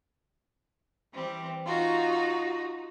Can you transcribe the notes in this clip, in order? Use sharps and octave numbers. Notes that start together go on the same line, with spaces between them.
E3 G3 C4
D#4 F4 F#4